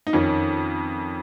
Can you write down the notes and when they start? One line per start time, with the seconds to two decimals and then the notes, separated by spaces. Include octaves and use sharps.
0.07 D#4
0.13 F2 D#3 C#4